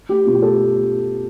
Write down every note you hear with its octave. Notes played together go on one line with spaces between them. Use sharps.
A3 G4
B2 F4
G4
A3 A4